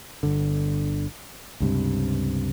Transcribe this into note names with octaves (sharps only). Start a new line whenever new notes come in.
G1 D3
C#2 G2 C3